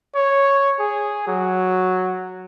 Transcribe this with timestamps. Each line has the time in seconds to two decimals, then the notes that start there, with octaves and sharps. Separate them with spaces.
0.15 C#5
0.79 G#4
1.27 F#3